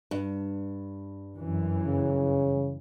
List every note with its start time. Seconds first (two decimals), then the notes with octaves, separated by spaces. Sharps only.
0.11 G2
1.36 F#2 E3
1.86 C#3